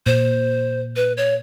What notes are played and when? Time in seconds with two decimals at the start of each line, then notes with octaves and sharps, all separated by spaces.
0.06 A#2 C5
0.96 B4
1.17 C#5